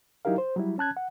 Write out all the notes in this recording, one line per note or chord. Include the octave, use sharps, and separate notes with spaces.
F#3 D#4 E4 G4 A#4 F5
C5
F#3 G3 E4
C#4 A5 F#6 G#6
F#5